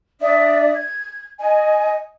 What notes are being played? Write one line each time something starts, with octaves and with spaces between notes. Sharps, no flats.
D4 D5 E5 D#6
G#6
D#5 G#5